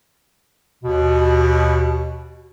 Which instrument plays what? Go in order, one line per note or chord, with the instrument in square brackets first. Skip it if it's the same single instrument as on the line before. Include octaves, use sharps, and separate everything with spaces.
[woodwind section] D#2 B2